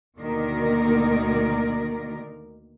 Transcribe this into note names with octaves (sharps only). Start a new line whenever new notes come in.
D2 B2 D#3 A#3 A#4 D5